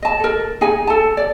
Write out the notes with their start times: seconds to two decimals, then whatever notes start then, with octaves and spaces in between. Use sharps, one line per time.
0.02 D#5 A5
0.20 A4 A#4
0.61 D#4 G#4 G#5
0.87 A4 A5
1.17 D5